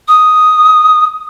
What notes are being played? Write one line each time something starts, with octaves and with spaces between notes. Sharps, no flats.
D#6